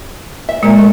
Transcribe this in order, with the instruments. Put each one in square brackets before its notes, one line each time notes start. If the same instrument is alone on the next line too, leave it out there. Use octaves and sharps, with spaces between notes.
[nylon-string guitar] E5
[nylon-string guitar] A#2 A#3 [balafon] G#3
[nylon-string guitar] F3 F#3 A3